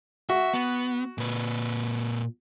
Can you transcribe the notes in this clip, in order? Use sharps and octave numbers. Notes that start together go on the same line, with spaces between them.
F#4 E5
B3
A#2 B4